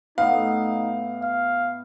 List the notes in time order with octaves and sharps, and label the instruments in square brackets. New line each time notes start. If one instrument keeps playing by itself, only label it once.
[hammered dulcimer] A2 B3 [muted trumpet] D#4 [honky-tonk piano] F5
[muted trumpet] F5